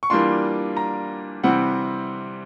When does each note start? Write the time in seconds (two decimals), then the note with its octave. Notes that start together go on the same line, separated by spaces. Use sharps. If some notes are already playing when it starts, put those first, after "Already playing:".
0.03 C#6
0.10 E3 G3 A#3 D4 F4 C6
0.77 A#5
1.44 C3 E3 G3 C4 F#5